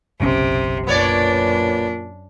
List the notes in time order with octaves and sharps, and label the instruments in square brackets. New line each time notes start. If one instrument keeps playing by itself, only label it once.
[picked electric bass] F#1 B1 C#4 [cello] C3
[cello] F#2 D4 [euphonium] A#2 [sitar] B3 C#5 D5